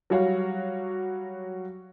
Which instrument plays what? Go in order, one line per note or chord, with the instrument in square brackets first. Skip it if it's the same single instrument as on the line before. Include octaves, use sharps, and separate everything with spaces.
[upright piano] F#3 G3 F#4 C#5 F5 F#5